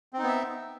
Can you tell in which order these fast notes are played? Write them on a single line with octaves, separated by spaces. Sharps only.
C4 D#4 B3 E5